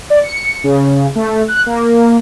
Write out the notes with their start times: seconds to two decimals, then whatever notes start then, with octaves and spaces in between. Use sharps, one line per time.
0.10 D5
0.23 C#7
0.64 C#3
1.15 A3
1.48 F#6
1.66 A#3